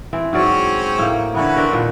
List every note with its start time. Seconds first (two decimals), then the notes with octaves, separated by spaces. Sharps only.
0.13 E3 C4
0.33 G#2 F#3 C4 C#4 C#5 D5
0.99 A2 A#3
1.35 D3 E3 B3 C#4 F#4 B4
1.56 C4 D4 A#4
1.72 A#2 D#3